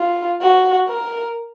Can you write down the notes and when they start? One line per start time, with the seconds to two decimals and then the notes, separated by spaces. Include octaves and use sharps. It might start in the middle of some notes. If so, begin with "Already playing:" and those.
Already playing: F4
0.41 F#4
0.88 A#4